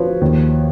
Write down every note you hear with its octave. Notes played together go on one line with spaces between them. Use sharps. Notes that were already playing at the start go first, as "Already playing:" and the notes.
Already playing: F3 B4 C#5
D#2